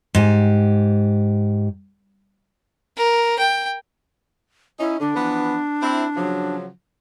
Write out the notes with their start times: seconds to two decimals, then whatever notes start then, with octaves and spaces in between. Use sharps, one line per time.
0.15 G#2 G4 G#5
2.96 A#4
3.38 G5
4.80 C#4 D#4 E4
5.00 D3 D4
5.15 E3 F3 B3
5.82 C4 E4
6.17 C#3 F3 F#3